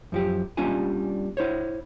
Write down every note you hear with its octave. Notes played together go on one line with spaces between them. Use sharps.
F#2 F3 G4
G3 A#3 C#4 D4 F4 G#5
E4 C5 C#5